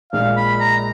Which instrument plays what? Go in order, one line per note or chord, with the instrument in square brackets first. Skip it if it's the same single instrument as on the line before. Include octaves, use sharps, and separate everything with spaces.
[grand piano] A#1 A#2 G#3 D#4 [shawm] F5
[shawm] B5
A#5